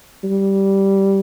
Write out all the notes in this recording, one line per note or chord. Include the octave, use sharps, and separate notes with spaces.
G3